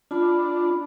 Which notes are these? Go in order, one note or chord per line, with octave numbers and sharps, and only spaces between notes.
D4 F4 A5 B5